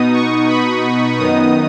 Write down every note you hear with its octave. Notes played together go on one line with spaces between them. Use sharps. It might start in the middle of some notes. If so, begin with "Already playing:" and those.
Already playing: B2 B3 D#4 D#6
C#6
B5
F#2 D#3 B3 D#4 D#6